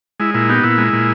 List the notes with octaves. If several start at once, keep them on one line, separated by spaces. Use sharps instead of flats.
G#3 E4
A#2 E4
B3 D#4 G4
A#2 E4
G#3
A#2